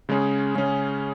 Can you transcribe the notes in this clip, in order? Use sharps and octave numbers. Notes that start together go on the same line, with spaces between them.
C#3 G#3 C#4 G#4
C#3 G#3 C#4 G#4